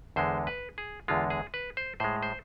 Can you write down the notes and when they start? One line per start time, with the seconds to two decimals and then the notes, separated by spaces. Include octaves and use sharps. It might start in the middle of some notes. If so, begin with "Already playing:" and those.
0.16 E2 D3 G#3 C5
0.47 B4
0.78 G#4
1.08 E2 D3 G#3 F4
1.30 G#4
1.54 B4
1.77 C5
2.00 A2 G#3 C5
2.23 C5